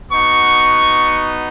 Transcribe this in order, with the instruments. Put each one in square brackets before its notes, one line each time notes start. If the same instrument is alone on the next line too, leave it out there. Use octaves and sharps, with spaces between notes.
[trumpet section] B3 D#4 F#4 C#6